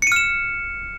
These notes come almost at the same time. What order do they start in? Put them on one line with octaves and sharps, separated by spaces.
C#7 D#7 F6 E7